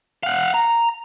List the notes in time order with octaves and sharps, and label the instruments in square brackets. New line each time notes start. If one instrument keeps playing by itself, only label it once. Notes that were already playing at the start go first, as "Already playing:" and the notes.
[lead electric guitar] F5 F#5
A#5